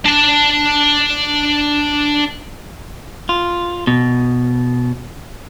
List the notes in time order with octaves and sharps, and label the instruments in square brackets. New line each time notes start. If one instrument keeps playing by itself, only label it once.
[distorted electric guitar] D4 A5
[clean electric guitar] F4
B2